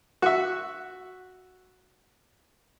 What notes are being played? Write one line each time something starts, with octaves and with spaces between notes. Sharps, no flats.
F#4 E5